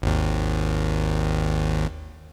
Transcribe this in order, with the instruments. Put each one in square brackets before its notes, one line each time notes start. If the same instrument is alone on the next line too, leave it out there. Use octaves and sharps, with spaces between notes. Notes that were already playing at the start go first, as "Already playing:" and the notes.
[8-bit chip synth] G#1 D#2